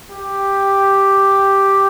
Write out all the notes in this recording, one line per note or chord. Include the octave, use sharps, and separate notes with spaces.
G4